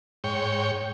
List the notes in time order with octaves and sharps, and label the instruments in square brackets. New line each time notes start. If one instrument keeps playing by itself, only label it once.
[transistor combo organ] G#2 C#5 G5